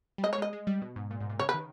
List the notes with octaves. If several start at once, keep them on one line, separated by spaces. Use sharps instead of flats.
G3
G#3 D#5
C#5
G#3 D#5
G#3
G3
B2
G#2
A#2
G#2
A#2
C#3 C#5
B4
D#3